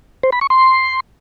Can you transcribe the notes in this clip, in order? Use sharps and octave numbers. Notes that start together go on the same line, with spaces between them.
C5
B5
C#6
C6